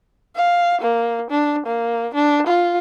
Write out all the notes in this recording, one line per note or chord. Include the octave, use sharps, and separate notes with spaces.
F5
A#3
D4
A#3
D4
F4